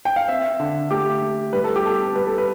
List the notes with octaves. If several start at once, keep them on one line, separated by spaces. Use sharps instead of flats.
G5
F5
C4 E5
D3
A3 G4
A3
G3 B4
A4
G4
B3 A4
G3 B4
A4
B4